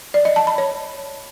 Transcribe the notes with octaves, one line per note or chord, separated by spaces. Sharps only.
D5
D#5
A5
B5
C#5